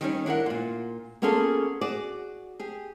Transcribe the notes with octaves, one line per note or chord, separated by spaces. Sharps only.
D#3 G3 C#4
D4 E4 A#4 F#5
A#2 F4
A#3 B3 C#4 F4 G#4 A4
F#4 G#4 D5
G4 G#4